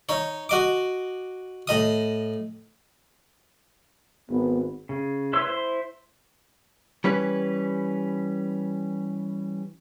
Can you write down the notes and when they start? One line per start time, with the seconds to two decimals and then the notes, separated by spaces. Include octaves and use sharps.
0.09 D#4 C#5
0.49 F#4 D#5 D6
1.67 A2 D#5 D#6
4.29 G#1 B3
4.89 C#3
5.33 E4 B4 C#5 C6 E6
5.47 E4 C5 C6
7.04 E3 G3 C#4 B4